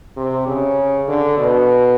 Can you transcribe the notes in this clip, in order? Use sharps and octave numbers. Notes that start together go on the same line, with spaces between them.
C3
C#3
D3
B2